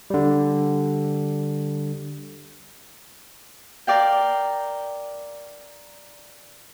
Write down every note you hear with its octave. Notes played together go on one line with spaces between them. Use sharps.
D3 G3
A#4 D5 F5 G5